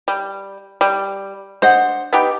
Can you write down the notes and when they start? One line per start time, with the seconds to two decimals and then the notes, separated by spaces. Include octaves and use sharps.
0.08 G3
0.81 G3
1.62 D4 C5 D#5 F#5
2.13 B3 D#4 G4